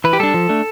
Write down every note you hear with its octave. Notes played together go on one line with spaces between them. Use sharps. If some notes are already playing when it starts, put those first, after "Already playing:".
E3 B4
G4
G3 D4 A4
F3
A3 D4